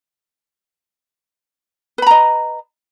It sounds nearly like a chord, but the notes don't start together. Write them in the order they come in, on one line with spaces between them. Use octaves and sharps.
B4 B5 A#5 D#5